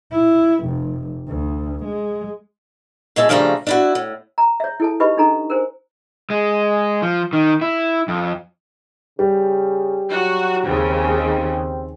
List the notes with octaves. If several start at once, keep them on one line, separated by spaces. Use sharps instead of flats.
E4
F1
D2
G#3
C#3 G#3 E4 A5
C#3 F3 G3 A3 D4 A#5
D4 E4 F#4
A2
A#5
C#5 E5
E4 A4 A5
D#4 G4 B4 D#5 B5 C#6
D4 D#4 A4 A#5
A#4 C5 G#5
G#3
F3
D#3
E4
F2
C#3 G3
F#3 F#4
D#2 C#3 C4